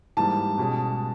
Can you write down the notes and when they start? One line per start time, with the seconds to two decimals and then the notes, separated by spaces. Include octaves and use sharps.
0.17 G#2 E3 G3 A#3 A5
0.58 B2 G#3 C#4